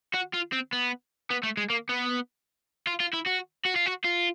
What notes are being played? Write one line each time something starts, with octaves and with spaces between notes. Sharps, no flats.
F#4
F4
C4
B3
B3
A3
G#3
A#3
B3
F4
F4
E4
F#4
F#4
F4
F#4
F4